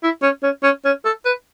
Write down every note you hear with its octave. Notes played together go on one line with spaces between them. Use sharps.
E4
C#4
C#4
C#4
C#4
A4
B4